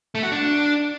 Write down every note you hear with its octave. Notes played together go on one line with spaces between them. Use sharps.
A3
F#4
D4